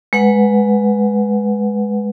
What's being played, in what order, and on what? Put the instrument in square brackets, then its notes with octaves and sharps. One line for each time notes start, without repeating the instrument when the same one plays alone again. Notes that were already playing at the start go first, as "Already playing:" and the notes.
[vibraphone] G#3 B4 F#5